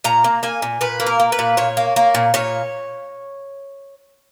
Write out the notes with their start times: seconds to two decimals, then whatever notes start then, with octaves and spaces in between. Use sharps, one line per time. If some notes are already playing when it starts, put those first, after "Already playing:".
0.04 A#2 A#5
0.24 A#3
0.43 A#3 G#5
0.62 A#2
0.81 A#2 B4
1.00 A#3
1.06 A#4
1.20 A#3
1.32 B4
1.39 A#2
1.57 A#2 C#5
1.77 A#3
1.96 A#3
2.15 A#2
2.34 A#2 C#5